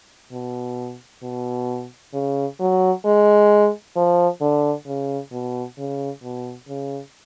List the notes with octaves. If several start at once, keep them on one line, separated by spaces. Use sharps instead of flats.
B2
B2
C#3
F#3
G#3
F3
D3
C#3
B2
C#3
B2
C#3